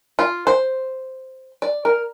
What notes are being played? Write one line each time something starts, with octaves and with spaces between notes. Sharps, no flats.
F4
C5
D5
A#4